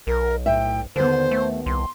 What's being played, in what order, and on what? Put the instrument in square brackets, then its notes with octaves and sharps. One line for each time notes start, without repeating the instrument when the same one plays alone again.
[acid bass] B1 [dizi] A#4
[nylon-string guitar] A2 E5 [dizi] G5
[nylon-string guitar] D#2 B3 [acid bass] D3 [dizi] C5
[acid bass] A3
[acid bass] C2 [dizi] C6